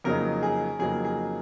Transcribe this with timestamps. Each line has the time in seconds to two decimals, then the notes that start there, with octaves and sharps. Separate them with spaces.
0.04 F2 C#3 F#3 A#3 D#4 A#4
0.43 G#4
0.79 F2 C#3 F#3 A#3 D#4 G#4
1.05 G#4